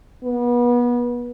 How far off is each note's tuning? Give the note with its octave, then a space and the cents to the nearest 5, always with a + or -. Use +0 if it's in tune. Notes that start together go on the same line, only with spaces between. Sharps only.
B3 -30